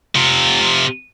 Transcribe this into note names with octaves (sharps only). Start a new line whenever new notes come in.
C3 F4